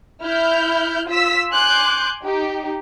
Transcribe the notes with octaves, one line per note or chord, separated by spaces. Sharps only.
E4 F6 G6
F4 E6 B6
G#5 C6 D6 F#6 G6
D#4 G4